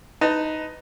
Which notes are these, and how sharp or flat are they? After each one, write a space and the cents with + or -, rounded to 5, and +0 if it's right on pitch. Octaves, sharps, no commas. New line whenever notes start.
D#4 +5 B4 +15 A5 +25